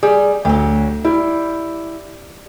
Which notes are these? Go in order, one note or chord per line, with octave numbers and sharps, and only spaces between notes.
G3 G#4
D2 F#3 G4
G3 E4